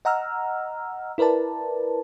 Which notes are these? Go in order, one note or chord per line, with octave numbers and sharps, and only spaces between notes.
D#5 F#5 A#5 E6 F6
E4 A#4 B4 D5 A5